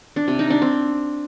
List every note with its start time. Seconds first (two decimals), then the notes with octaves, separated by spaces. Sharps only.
0.16 D4
0.28 C3
0.39 D#4
0.50 D4
0.62 C4